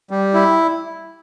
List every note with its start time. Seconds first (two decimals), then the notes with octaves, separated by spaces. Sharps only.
0.11 G3
0.34 E4